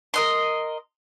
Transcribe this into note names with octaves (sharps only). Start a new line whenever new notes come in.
A#4 D#5 C6